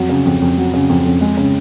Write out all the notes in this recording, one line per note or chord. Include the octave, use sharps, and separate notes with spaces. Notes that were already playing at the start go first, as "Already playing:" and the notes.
Already playing: F2 F#3
C#3
F2
F2
F#3
C#3
F2
F2
G#3
C#3